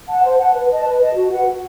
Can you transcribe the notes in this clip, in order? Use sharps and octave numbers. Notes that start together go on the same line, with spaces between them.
F#5 A5
C5
F#5 A5
B4
D#5 A5
B4
D#5 A5
F#4
B4 F#5
F#4